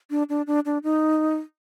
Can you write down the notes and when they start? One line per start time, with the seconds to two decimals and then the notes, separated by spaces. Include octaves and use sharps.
0.10 D4
0.29 D4
0.47 D4
0.65 D4
0.84 D#4